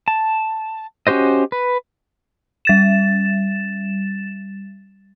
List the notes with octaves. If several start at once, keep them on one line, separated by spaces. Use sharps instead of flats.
A5
C#4 F#4 G4 C5 D#5
B4
G3 A6 E7